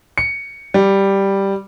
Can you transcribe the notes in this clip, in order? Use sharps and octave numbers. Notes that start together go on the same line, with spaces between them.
C#7
G3